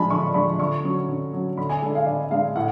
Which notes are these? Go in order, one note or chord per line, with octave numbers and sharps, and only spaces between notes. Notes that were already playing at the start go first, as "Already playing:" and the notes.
Already playing: F3 G#3 D4 G#5 A5 B5
D3 C#6
F3 G#3 D4 B5
D3 C#6
F#3 C#4
D3
F#3 C#4
D3 B5
G#5
G#3 D4 A4
F5
D3 D5
G#3 D4 F5
A2 F#5